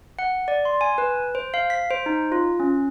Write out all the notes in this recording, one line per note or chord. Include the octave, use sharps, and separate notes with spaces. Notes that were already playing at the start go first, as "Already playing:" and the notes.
F#5
D5
C6
G#5
B4
C5
F5
B6
C5
D#4
F4
C#4